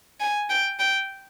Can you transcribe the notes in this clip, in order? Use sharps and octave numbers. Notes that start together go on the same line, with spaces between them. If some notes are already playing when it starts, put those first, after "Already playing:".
G#5
G5
G5